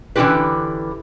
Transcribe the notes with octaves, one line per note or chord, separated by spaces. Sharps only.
D3 E3 C#4 F4 G4 B4